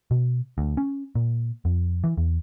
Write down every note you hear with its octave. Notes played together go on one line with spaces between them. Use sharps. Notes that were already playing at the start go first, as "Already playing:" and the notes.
B2
D2
C#4
A#2
F2
E3
E2